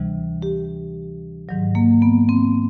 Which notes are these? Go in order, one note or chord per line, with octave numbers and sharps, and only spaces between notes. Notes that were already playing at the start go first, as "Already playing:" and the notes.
Already playing: D2 C3 E3 G3
G4
G#2 D#3 F#3
A#3
B3
C4